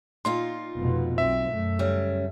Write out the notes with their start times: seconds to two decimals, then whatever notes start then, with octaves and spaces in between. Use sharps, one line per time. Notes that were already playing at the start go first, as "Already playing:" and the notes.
0.25 A#2 D#4 F4 C6
0.75 F1 B2 B3
1.18 B1 C4 E5
1.49 F#2 A3
1.79 C#3 G3 C#4